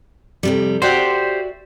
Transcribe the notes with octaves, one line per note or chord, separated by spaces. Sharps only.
F2 C3 G3
F#4 G4 C5 D5 E5